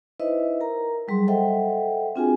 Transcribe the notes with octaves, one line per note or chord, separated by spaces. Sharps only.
D#4 E4 B4 C5 D#5 E5
A#4 A#5
F#3 G3 G#4 C6
A4 C5 D#5 E5 F#5 G5
C4 D4 F4 F#4 G#4 G#5